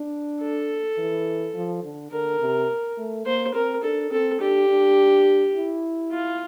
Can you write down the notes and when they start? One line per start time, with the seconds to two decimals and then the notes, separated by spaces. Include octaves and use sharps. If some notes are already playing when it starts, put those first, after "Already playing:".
Already playing: D4
0.41 A4
0.98 E3
1.55 F3
1.84 D3
2.12 D3 A#4
2.40 C3
2.98 A3
3.26 A#3 C5
3.54 C4 A#4
3.83 D4 A4
4.11 C4 A4
4.40 D4 G4
4.69 D4
5.55 E4
6.11 F4